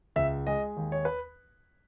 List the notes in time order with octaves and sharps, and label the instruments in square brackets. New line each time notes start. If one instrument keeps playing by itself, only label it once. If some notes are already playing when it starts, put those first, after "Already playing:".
[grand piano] C#2 E5
G#3 D#5
D#2
C#5
B4